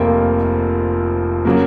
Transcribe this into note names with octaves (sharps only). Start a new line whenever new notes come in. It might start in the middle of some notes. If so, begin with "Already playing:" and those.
Already playing: F1 F2 F3 A#3 F4
C#3 F#3 A#3